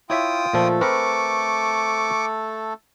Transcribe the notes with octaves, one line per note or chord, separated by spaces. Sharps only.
E4 F4 C#5 E5 G5 D#6
A#2 F3 A3 A4
C4 A#4 B4 C#6 D6